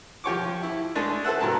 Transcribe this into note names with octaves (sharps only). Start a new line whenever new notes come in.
F3 G4 C#5 D6
E4
G#3 A3 D4 G#4 A4
A4 C5 E5 F#5
G2 A#2 F#3 A#4 A5